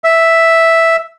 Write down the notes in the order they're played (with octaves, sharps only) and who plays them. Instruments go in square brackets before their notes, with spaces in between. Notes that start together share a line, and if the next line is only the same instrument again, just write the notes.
[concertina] E5